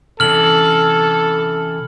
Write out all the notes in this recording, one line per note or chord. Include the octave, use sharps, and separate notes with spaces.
C3 E3 C#4 A4 F6 F#7